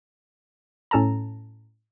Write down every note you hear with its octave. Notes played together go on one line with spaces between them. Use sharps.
A2 C#4 A4 A5 A#5